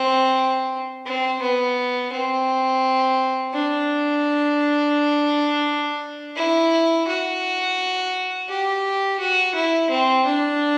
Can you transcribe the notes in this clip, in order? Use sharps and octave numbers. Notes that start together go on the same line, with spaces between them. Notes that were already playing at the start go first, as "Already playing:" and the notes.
Already playing: C4
C4
B3
C4
D4
E4
F#4
G4
F#4
E4
C4
D4